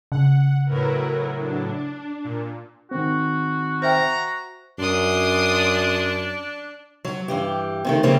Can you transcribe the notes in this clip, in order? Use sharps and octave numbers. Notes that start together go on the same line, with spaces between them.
C#3 F#5
A2 F#3 E4 A#4 B4
D4
A#2
D#3 C4 F#4
C5 E5 G5 A#5
F#2 D4 C6 D#6
F#3
G2 E3 G4
C3 D#3 A3
C#3 E3 F3 G3 A#3 C4